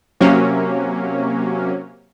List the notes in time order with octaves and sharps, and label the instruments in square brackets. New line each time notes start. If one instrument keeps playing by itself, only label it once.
[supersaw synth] C3 F#3 A#3 C#4